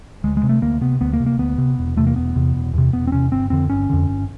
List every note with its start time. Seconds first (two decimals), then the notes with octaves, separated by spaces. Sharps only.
0.24 D2 G#3
0.37 G#3
0.43 C3
0.49 A3
0.62 D2 A#3
0.81 C3 B3
1.01 D2 B3
1.13 A#3
1.20 C3
1.26 A#3
1.39 D2 B3
1.58 C3
1.78 E1
1.96 E2 C3 A3
2.07 A#3
2.16 E1 B3
2.36 E2 C3
2.55 E1
2.73 E2 C3
2.93 E1 B3
3.07 C4
3.12 E2 C3 C#4
3.32 G1 C4
3.50 F2 D3 C4
3.70 G1 C#4
3.89 F2 D3
4.08 G1